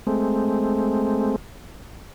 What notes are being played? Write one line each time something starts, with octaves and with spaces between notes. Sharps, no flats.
G#3 A3 C4